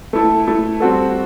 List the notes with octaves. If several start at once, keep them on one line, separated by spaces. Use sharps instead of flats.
A3 E4 A4
A3 E4 A4
G3 C4 F#4 A4